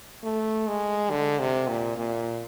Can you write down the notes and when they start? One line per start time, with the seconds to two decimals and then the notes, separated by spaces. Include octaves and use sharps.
0.24 A3
0.68 G#3
1.11 D3
1.40 C3
1.68 A#2
1.97 A#2